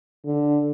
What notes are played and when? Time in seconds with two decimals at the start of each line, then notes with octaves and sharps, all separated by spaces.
0.26 D3